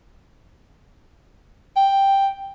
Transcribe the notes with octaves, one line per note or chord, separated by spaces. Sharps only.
G5